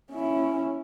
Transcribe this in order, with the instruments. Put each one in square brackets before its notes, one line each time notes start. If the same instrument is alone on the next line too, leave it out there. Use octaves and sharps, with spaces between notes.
[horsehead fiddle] C#4 E4